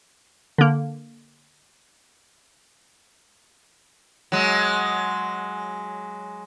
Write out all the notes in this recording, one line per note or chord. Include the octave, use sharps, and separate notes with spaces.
D3 A#3
F#3 G#3